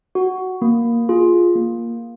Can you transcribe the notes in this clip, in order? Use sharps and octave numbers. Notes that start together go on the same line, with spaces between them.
F#4
A#3
F4 G#4
A#3